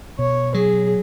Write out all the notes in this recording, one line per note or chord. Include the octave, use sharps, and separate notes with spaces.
B2 C#5
F#3 G#4